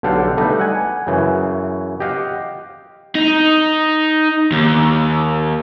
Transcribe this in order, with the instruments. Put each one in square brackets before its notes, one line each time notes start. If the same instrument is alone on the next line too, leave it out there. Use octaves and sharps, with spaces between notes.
[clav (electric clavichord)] B1 D3 G4 F5 F#5 A5
G3 A3 D#4 B4
F#5 G#5
F#2 C#3 E3
G4 D#5 F5 F#5
[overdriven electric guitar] D#4
D#2